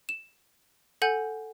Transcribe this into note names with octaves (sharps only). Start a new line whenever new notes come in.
E7
A4 F#5 G#5 G6